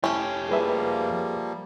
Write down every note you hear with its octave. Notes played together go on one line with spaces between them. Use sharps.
F2 A3 C#4 E4 G4
F3 G3 A#3 G#4 B4 E5